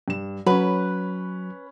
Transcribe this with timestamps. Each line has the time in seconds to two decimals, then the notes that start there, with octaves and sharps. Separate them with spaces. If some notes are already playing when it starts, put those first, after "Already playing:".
0.08 G2 E7
0.47 F#3 C#4 B4 B5